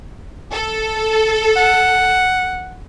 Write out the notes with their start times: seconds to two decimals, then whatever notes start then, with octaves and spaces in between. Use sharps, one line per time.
0.53 A4
1.57 F#5